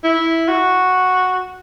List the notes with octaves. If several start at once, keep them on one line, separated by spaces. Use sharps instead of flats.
E4
F#4